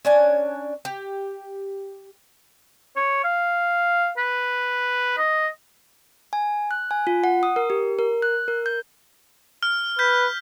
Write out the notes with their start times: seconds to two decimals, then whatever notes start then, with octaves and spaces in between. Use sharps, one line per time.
0.05 C#4 D4 G#5
0.85 G4
2.96 C#5
3.24 F5
4.17 B4
5.18 D#5
6.33 G#5
6.71 F#6
6.91 G#5
7.07 F4
7.24 F#5
7.43 D#6
7.56 A#4
7.70 G4
7.99 A#4
8.22 F#6
8.48 A#4
8.66 G6
9.63 F6
9.99 B4 G6 B6